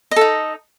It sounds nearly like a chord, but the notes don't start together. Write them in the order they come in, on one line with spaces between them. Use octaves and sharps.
D#5 A4 D#4